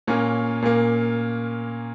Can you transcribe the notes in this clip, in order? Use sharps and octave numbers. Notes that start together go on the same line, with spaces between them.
A#2 A#3 C#4
A#2 A#3